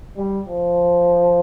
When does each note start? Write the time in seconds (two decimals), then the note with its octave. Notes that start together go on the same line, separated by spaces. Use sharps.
0.17 G3
0.49 F3